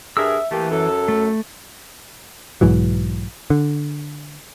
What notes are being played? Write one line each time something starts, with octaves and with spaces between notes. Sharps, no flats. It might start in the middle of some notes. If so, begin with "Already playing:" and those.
G2 G#4 A#4 E5 E6
E3 A3 A#3 G4
F#2 A4
A3
B1 G#2 E3 F#3
D3